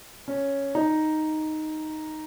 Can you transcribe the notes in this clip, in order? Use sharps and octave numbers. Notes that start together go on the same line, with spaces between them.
C#4
D#4